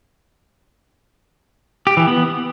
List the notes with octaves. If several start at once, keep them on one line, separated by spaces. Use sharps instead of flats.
G4
E3
B3